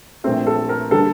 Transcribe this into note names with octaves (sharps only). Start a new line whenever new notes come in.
A#1 A#2 A3 C4
A4
A#4
D3 G3 A#3 A4